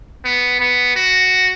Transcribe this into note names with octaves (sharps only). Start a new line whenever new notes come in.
B3
B3
F#4